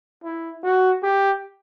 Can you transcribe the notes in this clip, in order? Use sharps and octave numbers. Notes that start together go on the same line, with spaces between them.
E4
F#4
G4